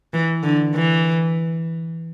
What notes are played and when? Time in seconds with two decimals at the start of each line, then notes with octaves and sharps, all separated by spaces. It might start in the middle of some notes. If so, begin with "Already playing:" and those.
0.13 E3
0.43 D3
0.75 E3